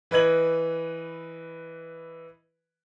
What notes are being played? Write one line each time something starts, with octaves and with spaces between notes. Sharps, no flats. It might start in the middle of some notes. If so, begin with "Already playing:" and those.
E3 B4 D#5 G#6 F#7